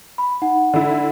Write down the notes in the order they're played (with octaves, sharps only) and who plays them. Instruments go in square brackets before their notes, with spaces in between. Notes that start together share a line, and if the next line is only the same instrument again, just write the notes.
[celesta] B5
D#4 F#5
[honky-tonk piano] D3 E4